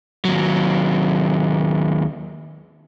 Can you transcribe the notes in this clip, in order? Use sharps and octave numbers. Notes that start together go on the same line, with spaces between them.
D#2 F#3